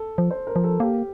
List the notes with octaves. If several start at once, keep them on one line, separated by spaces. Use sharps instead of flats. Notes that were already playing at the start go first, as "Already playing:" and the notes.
Already playing: A4
F3
C5
A#4
F3
A4
A#3 G4